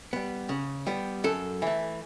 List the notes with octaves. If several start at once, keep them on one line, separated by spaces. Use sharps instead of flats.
G3 B3
C#3
G3 B3
F#2 A4
E3 A3